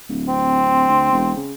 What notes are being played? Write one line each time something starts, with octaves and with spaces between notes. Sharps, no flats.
D1
C4
D2
E1
C#3